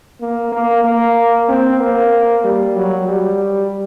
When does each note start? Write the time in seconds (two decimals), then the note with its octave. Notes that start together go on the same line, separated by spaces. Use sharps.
0.21 A#3
0.52 A#3
0.84 A#3
1.48 C4
1.80 A#3
2.44 G3
2.76 F#3
3.08 G3